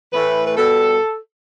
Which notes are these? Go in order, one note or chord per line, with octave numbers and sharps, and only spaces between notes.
A2 E3 A3 B4
B4
B2 G3 A4